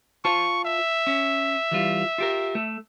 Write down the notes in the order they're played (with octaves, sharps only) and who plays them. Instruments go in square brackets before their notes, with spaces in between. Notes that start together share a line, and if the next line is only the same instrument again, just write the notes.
[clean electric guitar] F4 C5 A5 [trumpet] C#6
[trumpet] E5
[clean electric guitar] C#4
E3 G3 F4
F4 G4 A#4
A3